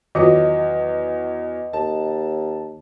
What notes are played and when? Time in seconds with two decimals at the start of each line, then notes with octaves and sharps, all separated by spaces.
0.15 E2 D#3 F#3 F4 F#4 D#5
1.73 D#2 A5